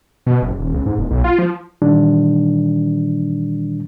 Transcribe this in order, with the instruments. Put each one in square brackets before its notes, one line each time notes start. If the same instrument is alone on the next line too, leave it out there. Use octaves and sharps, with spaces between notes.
[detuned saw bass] B2
F#1
D#1
C#2
G#2
E1
B1
F4
F3
[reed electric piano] A#2 D#3 E3 G3 D4